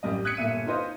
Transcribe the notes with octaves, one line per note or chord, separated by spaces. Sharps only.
A1 F#2 G3 D#5
D#6 F#6 G#6 B6 C#7
G1 A#2 E5 D#7
D#4 F4 B4 C5 D#5